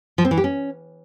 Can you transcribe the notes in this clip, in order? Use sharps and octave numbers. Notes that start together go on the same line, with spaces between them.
F3
C4
E3
G4
C#4